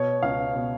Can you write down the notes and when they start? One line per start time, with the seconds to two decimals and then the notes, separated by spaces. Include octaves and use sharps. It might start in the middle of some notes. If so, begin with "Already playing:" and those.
Already playing: B2 C#5
0.23 C#2 F5
0.56 B2